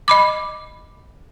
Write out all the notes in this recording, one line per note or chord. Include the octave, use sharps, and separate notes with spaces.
D#5 B5 D6